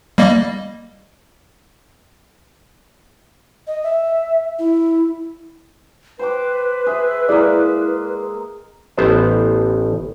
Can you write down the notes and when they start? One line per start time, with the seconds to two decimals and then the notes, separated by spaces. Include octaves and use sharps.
0.18 G3 A#3 D#5
3.67 D#5
3.83 E5
4.59 E4
6.19 B4 C5 G5 D6
6.86 G#4 E5
7.29 G#3 A#3 E4 G#4 D5
8.97 A1 B3 C5